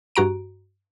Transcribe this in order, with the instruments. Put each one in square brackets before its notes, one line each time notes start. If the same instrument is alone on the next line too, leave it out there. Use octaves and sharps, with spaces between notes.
[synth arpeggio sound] G2 F#4 A#5 D7